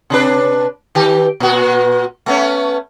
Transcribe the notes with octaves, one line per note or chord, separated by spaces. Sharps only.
C3 D4 B4
D#3 G4
A#2 F#4
A3 B3 C#4